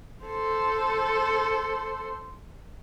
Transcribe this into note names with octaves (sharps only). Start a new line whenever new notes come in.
A4 C5